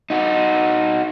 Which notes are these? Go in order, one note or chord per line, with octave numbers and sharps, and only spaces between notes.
D#4 F#4